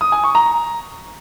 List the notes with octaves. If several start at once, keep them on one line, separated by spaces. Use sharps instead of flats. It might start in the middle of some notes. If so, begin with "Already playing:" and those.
D#6
G#5
C#6
A#5